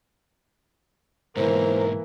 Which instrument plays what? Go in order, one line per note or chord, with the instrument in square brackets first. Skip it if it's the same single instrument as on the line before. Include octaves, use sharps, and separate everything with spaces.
[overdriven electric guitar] G#2 B2 [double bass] E3 A#3 [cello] A#4 [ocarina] C5